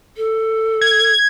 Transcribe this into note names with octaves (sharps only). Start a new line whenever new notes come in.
A4
G#6